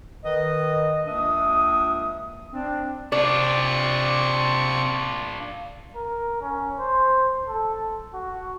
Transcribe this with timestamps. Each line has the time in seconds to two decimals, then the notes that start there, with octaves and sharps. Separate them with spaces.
0.24 D#3 B4 D#5
1.06 C#2 A#3 D4 E5 D#6
2.52 C4 D4
3.12 C3 D4 F4 D5 C#6
5.95 A#4
6.41 C#4
6.79 C5
7.48 A4
8.14 F#4